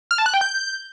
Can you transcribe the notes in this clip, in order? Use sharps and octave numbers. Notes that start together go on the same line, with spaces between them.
F6
A5
F#6
G5
G6